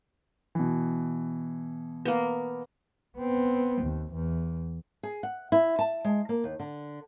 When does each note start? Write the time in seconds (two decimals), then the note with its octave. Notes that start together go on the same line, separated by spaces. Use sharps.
0.55 B2 E3
2.05 A#3 B3
3.18 B3 C4
3.83 D#2
4.13 E2
5.03 G#4
5.23 F#5
5.52 E4
5.79 A5
6.05 G#3
6.29 A#3
6.44 D#2
6.60 D3